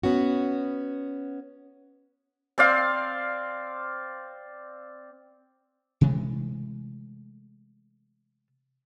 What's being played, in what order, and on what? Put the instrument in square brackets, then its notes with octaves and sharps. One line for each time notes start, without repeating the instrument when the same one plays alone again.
[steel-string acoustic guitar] B3 C#4 F#4
[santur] C4 D5 F5
[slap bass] C3 E3 G#3 A3